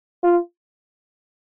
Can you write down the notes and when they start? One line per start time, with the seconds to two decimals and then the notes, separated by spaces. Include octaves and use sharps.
0.24 F4